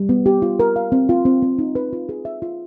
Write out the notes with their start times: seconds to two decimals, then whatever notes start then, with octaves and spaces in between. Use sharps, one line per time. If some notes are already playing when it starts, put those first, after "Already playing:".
Already playing: G3
0.09 B3
0.26 G4
0.42 F4
0.60 A#4
0.76 F5
0.92 C4
1.09 F4
1.25 C4
1.42 C4
1.59 D#4
1.75 B4
1.93 F4
2.09 G#4
2.25 E5
2.42 F4